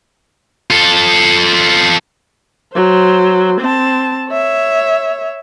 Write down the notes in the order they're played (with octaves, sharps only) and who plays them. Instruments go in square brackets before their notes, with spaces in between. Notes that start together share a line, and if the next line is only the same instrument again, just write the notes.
[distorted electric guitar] F4 A4
[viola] F#3 C5
C4 A5
C#5 E5